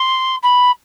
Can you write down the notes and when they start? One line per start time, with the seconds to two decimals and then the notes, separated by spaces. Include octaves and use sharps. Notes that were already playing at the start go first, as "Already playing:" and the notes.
Already playing: C6
0.43 B5